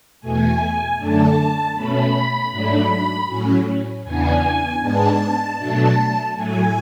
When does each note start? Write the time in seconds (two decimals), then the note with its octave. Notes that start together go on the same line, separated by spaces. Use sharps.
0.21 E2 B2 A3 G#5
0.97 F#2 D3 A3 D4 A5
1.74 B2 A3 C#4 B5
2.51 G#2 F#3 A3 D4 B5
3.27 A2 F#3 C#4
4.04 E2 C#3 E3 B3 D4 G#5
4.81 G#2 G#3 B3 D4 A5
5.58 B2 F#3 A3 D4
6.35 A2 F#3 A3 G#5